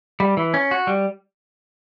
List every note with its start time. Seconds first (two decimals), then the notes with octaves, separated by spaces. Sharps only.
0.20 G3
0.37 E3
0.54 C#4
0.71 F#4
0.87 G3